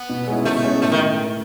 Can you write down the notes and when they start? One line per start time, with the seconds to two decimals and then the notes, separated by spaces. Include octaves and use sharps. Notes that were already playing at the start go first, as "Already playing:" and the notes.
Already playing: B3
0.09 B2
0.27 G#3 C#4 E4
0.45 B2 A3
0.64 G#3 C#4 E4
0.82 A2 A3
0.92 D#3